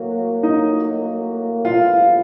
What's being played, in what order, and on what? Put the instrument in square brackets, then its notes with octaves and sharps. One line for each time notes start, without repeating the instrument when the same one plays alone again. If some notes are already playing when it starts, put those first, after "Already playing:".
Already playing: [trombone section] A2 F#3 A#3
[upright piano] D#4 D#5
[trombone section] A#1 A2 E3 G3 B3 [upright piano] F4 F5